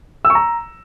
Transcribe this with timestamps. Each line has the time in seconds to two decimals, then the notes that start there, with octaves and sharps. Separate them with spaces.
0.25 E6
0.30 C#6
0.35 A#5